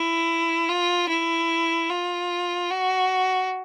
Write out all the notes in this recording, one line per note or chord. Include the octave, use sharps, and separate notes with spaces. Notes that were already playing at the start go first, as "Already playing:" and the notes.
Already playing: E4
F4
E4
F4
F#4